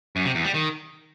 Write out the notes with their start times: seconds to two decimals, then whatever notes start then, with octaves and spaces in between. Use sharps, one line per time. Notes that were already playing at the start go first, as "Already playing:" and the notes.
0.16 F#2
0.25 C3
0.35 E2
0.45 G3
0.54 D#3